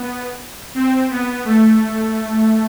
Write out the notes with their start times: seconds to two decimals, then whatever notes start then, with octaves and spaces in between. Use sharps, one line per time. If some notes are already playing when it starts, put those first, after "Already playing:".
Already playing: B3
0.75 C4
1.10 B3
1.45 A3